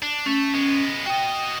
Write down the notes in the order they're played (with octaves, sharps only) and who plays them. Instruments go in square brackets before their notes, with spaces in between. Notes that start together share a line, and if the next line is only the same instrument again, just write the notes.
[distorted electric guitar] D4
[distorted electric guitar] A3 [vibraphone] C#4
[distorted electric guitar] G#3 B3
[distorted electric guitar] F#4 D#5 [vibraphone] G5